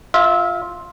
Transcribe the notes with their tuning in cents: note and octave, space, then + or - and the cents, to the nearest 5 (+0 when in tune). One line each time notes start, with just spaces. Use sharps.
F4 +5 E5 -20